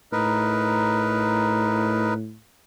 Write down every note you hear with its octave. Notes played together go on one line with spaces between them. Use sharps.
A2 D#4 A#4 B4